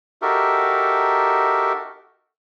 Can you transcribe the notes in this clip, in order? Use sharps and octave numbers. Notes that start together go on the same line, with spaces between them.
D#4 F#4 G4 A4 A#4 E5